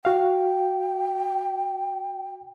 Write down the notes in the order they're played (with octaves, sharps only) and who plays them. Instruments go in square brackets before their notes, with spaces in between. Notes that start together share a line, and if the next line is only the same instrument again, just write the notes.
[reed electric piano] F#4 F5 [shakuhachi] G5